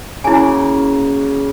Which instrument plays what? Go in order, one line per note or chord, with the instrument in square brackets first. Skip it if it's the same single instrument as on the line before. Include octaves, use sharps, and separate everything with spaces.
[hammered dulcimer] C#3 A#3 F#4 [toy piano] E4 G#5